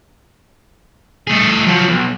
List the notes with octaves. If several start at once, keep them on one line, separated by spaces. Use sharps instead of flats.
A3 G#4
F3 F#3
B1